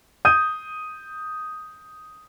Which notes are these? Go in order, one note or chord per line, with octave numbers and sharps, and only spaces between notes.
D#6 G6 D#7